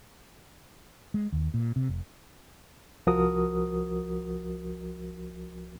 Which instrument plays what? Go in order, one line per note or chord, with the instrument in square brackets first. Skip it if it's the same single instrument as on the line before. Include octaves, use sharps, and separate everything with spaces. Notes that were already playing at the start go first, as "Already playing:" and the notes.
[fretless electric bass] G#3
D#2
A#2
C3
F1
[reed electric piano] C2 F3 F#4 A#4 D#6